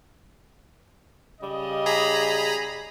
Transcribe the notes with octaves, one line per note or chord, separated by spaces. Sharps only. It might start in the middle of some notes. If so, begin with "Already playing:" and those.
C#3 G3 D#5
G#4 A#5 B5